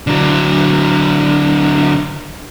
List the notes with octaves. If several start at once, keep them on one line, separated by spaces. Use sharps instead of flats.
D3 F#3